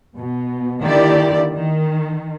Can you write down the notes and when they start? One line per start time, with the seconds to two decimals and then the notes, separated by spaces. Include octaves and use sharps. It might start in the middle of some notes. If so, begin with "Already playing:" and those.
0.16 B2
0.82 D3 D#3 A#3 E4 G4 D5
1.55 D#3